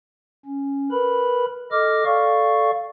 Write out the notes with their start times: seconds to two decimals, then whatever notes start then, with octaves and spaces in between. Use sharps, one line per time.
0.45 C#4
0.91 A#4 B4 B5
1.72 A4 D#5 D6 F6
2.05 A4 D5 F5 C#6